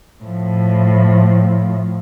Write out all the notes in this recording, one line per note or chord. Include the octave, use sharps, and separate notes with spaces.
A2 F3